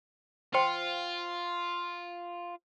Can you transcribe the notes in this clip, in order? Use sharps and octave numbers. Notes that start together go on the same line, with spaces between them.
F4 C5 G5 C6